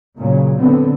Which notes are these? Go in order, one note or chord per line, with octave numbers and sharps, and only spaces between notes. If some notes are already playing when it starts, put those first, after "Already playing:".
A#2 C#3 F#3
D3 B3 C4